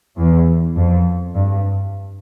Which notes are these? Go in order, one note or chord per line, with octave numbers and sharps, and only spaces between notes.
E2
F2
G2